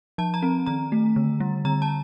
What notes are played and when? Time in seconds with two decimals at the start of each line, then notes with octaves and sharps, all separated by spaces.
0.18 F3 A5
0.34 A#5
0.43 C4
0.66 D#3 A#5
0.92 A3
1.16 D3
1.40 G3
1.65 D3 A#5
1.82 A5